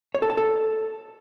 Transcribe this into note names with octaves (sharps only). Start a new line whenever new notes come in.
C#5
A4
A5
A4